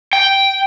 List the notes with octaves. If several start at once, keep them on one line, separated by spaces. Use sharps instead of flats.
G5